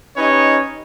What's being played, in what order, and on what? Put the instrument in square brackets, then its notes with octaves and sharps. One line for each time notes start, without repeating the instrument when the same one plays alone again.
[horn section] C#4 D#4 G4 B4 C#5 D#5